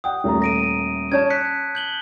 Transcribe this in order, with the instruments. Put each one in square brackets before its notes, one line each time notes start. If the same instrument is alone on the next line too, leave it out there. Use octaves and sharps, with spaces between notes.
[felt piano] F#5 G5 [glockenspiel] D#6
[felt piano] D#1 A3 A#5
[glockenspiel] A#6 D7 D#7
[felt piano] C#4 C#5 [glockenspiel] A5 G6 G#6
[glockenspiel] F#6 B6 C#7
G6 F#7 G7